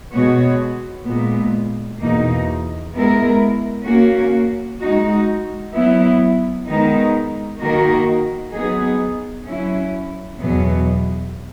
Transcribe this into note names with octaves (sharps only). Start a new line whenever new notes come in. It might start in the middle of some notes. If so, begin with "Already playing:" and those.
B2 G#3 B3 F#4 C#5
A#2 G#3 B3
E2 B2 A#3 D#4
G#3 B3 E4 A#4
A#3 C#4 F#4
G#3 D#4 F#4
F#3 B3 E4
D#3 G#3 B3 D#4
D#3 A#3 D#4 F#4 A#4
F#3 B3 D#4 G#4
F#3 C#4 E4
E2 B2 F#3 B3